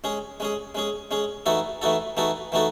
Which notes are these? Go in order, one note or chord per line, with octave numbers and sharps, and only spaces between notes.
G#3 C#4 G#4
G#3 C#4 G#4
G#3 C#4 G#4
G#3 C#4 G#4
E3 A3 D#4 F#4 A4
E3 A3 D#4 F#4 A4
E3 A3 D#4 F#4 A4
E3 A3 D#4 F#4 A4